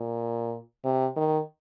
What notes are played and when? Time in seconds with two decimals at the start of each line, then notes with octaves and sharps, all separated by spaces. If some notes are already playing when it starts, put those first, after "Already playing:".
Already playing: A#2
0.85 C3
1.16 D#3